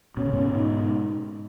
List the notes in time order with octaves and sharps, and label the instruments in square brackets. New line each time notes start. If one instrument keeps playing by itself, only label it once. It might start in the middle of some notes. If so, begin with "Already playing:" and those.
[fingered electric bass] B2 [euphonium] C#4
[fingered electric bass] C#3
G#2 B2
[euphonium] D#4